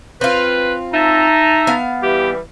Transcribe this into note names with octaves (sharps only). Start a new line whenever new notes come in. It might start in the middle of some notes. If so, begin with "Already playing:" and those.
C4 F4 B4
D#4 E5 A5 A#5
B3 F5
E3 G3 G4